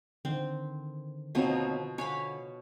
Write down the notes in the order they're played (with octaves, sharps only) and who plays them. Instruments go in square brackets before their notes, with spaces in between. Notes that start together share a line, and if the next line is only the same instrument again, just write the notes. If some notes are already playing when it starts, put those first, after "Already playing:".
[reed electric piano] D3 D#3 [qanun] C4
[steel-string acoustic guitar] D#2 C4 C#5 [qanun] B2 F3 D#4
[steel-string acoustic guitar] D3 G#5 [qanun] C#5 F5 B5